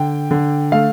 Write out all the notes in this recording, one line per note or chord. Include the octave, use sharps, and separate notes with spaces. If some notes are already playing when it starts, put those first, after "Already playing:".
Already playing: D3 G5
D3
A3 F5